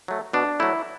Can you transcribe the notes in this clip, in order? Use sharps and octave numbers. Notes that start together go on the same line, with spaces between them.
F#3 A3
B2 D4
F#3 A3 E4